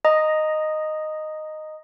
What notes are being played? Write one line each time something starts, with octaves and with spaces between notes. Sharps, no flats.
D#5 A#5 D#6